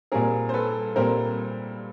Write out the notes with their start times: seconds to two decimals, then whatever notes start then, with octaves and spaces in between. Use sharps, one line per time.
0.12 A#2 G3 C4 G#4 A#4
0.49 C5
0.54 A4 B4
0.96 A#2 G3 C4 A#4 C5